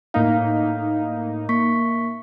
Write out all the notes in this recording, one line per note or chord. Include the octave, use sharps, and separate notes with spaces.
A2 A#3 D#4 F5
A#3 C#6 B6